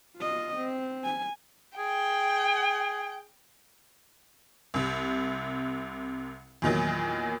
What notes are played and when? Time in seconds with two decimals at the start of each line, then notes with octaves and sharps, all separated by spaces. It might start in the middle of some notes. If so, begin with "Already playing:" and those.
0.17 F4 D#5
0.57 C4
1.04 G#5
1.78 G#4 G5
4.74 C2 C3
6.62 E2 A#2 D#3 F#3